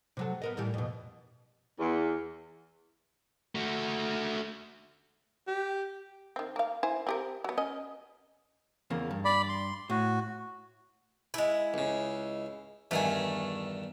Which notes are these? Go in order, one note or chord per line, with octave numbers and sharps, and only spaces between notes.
C3 F#3 A4
B3 A#4 D#5
A2 E3 G3
F2 B2
E2
A3 F#4
G4
D#3 C4
A#3 F5
E4 C5 G#5
C4 G4 A#4
F#3 B3
C#4 D#5
E2 C#3 A#3
G2
D5 B5
C6
A2 F#4
G#3 E4
C#2 C#3
E2 G2 D#3 A3 A#4 G#5